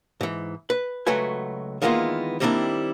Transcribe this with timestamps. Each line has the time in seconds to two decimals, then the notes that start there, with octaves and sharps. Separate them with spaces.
0.21 G#2 E3
0.70 B4
1.07 C#2 F#3 A3 F#4 B4 G#5
1.82 D#3 E3 G#3 A#3 B3 F4
2.40 D#3 G3 A#3 C4 D4 E4